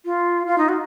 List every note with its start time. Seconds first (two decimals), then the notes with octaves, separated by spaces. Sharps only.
0.05 F4
0.47 F4
0.58 D#4
0.69 F#4